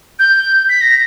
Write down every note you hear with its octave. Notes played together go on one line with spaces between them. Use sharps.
G6
B6
A#6